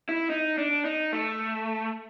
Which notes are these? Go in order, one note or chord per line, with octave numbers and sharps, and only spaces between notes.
E4
D#4
D4
D#4
A3